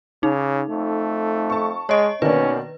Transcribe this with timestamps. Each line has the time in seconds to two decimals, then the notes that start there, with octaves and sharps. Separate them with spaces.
0.23 C#3 D#4
0.70 F2 A3
1.50 A5 C#6
1.89 G#3 C#5 D#5
2.22 B2 D#3 A#3 C#4 D4 B4